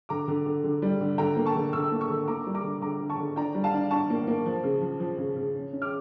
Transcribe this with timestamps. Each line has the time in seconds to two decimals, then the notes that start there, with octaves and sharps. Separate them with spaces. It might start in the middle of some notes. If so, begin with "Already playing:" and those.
0.09 D3 A#5 D6
0.28 D3
0.46 D3
0.64 D3
0.82 G3
1.01 D3
1.18 D3 G5 A#5
1.36 A#3
1.45 A5 C#6
1.55 D3
1.73 D3 C#6 E6
1.91 A#3
2.01 C#6 E6
2.10 D3
2.28 A#3 A#5 D6
2.46 G3
2.54 A#5 D6
2.63 D3
2.82 D3 A#5 D6
3.00 D3
3.10 A5 C#6
3.18 D3
3.36 D4 G5 A#5
3.55 G3
3.64 F5 A5
3.74 D4
3.91 D4 A5 C#6
4.10 A#3
4.27 A#3
4.46 F3
4.64 C#3
4.82 F3
5.00 F3
5.18 C#3
5.36 C#3
5.55 C#4
5.73 C#4
5.82 D6 F6